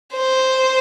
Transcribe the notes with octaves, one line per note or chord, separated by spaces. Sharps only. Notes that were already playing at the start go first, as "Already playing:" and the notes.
C5